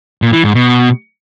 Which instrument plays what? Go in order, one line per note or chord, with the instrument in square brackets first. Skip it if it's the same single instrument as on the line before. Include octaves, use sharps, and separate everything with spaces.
[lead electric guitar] A#2
E3
G#2
B2